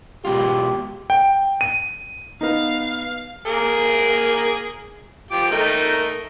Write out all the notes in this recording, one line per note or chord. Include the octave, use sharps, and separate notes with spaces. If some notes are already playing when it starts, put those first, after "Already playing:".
B2 G#3 F4 G4
G5
D#7
B3 D#4 F5
A#3 G#4 A#4
F3 G4 D6
A3 D#4 A#4